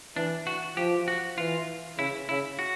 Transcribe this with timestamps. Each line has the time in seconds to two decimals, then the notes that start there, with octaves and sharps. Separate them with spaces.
0.16 E3 D4
0.47 F#4
0.77 F3 G4
1.08 F#4
1.38 E3 F4
1.98 C#3 E4
2.29 C#3 E4
2.59 F#4